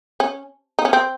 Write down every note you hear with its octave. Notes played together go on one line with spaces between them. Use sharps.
C#4
D#4
C#4
C4